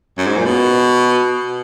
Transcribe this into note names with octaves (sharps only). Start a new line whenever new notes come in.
F#2
G#2
A#2
B2